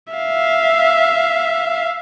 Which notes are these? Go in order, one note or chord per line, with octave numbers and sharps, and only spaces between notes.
E5 F5